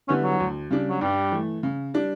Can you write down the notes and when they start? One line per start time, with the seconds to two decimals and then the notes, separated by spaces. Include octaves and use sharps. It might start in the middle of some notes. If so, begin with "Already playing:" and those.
0.08 D3 G3 B3 C#4 E4
0.24 F#3
0.40 D2
0.70 C#3 G3 D4
0.89 F#3
1.01 G2 G3
1.32 E3 A3
1.63 C#3
1.94 G3 D4